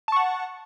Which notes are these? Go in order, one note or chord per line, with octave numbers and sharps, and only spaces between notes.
F#5 A5 C#6